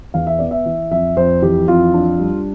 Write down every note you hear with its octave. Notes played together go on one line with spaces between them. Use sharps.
E2 F5
E5
B3 D5
E5
E3
F2 E5
F2 C5
E3 G4
F2 F4
D4
G3